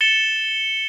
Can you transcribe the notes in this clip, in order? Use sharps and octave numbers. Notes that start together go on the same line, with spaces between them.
A6 C#7 E7 G7